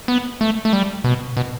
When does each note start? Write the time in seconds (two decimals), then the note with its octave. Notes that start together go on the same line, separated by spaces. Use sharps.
0.08 B3
0.41 A3
0.65 A3
0.73 G3
1.04 B2
1.37 B2